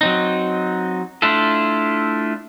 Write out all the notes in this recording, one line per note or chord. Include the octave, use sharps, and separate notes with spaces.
F#3 C4 D#4
A3 D4 E4 F4 A4